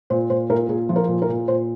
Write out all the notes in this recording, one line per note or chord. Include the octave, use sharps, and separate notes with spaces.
A#2 C5
A#2 C5
A#2 A#4
A#2 G#4
F3
A#4
A#2
A#4
A#2
A#2 C5